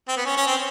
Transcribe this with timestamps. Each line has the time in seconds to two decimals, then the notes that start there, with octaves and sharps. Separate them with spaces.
0.08 C4
0.17 B3
0.26 C#4
0.37 C#4
0.47 C4